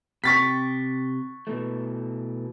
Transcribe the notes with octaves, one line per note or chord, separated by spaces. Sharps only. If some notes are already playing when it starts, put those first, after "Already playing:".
C3 G5 C#6 A6 B6
B2 E3 A3